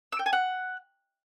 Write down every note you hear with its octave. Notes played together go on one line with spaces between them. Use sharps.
E6
G5
G#5
F#5